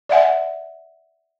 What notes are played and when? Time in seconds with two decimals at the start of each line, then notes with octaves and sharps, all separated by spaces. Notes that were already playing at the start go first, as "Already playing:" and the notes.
0.09 D5 E5 F#5 G#5